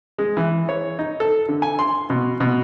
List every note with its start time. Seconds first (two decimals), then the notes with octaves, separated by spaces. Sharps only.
0.18 G#3
0.37 E3
0.69 C#5
0.99 D#4
1.20 A4
1.49 D3
1.62 G#5
1.79 C6
2.10 B2
2.40 B2